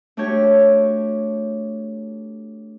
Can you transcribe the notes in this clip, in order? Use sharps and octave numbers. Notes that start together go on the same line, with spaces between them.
A3 D4 F#4 G4 C#5